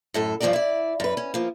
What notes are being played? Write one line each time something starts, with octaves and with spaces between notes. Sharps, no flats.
F#2 A2 A4
G2 F3 C4 D4 D#4 D5
E4 D5
F#2 B4
C#4
F3 A#3